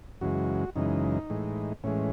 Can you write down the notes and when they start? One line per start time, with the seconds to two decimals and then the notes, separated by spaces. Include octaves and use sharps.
0.21 F#2 C#3 E3 G#3 F#4
0.76 F#2 C#3 E3 G#3 D#4
1.30 A2 E3 G#3
1.83 A2 E3 G#3 C#4